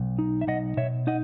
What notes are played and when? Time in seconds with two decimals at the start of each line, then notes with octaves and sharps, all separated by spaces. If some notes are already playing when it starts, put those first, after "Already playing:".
Already playing: B1
0.19 D#4
0.41 E5
0.47 B1 D#5 F#5
0.77 B2 C#5 E5
1.07 D#4 D#5 F#5